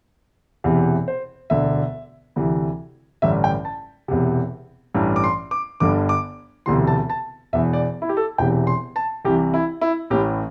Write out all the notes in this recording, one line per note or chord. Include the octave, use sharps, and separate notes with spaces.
E1 E2 C3 E3
C5
E1 D2 D3 E5
D2 C3 E3
A1 G2 D3 E5
G5
A5
E1 E2 C3
A1 G2 E3
D6
C6
D6
G1 G2 D3 D6
D6
E1 D2 C3 E3 C6
A5
A5
E1 E2 E3 E5
D5
E4
G4
A4
E1 E2 C3 E3 G5
C6
A5
C2 C3 E3 G4
E4
E4
A1 A2 E3 G4